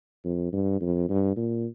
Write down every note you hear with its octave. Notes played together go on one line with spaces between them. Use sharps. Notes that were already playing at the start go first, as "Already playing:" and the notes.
F2
G2
F2
G2
A#2